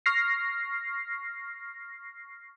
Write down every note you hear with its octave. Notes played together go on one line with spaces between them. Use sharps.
C#6 F6 A#6 C7